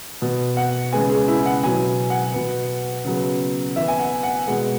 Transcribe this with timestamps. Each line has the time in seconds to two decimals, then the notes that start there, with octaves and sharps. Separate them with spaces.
0.21 B2 B3
0.57 F#5
0.93 C#3 G#3 B3 G#5
1.10 G#4
1.28 E4
1.46 F#5
1.63 B2 F#3 B3 G#5
2.10 F#5
2.34 B2 B3
3.05 C#3 F#3 B3
3.76 E3 B3 E5
3.88 G#5
3.99 F#5
4.23 F#5
4.47 B2 G#3 B3 F#5